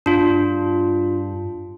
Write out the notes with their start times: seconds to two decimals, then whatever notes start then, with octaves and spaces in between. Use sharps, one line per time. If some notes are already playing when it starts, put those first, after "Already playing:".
0.06 G2 D4 F4